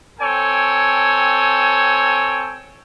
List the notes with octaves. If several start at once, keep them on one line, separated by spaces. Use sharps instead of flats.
C4 A4 C#5 G5 G#5